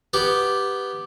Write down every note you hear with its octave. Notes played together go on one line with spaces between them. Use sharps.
B3 G4